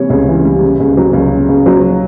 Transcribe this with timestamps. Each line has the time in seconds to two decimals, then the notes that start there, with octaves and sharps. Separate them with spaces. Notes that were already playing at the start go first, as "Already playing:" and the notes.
Already playing: C3 E3 G3 C#5
0.10 C#2
0.28 E3
0.44 G3
0.62 C#3
0.80 C#2
0.97 F#3
1.13 C#2
1.31 C#3
1.49 C#2
1.66 F#3